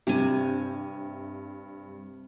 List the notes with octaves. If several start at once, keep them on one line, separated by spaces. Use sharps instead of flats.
G2 C3 G#5